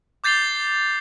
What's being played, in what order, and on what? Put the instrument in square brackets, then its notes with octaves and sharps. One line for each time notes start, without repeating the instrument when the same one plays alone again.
[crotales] D6 G6 A6 C7 F7 G7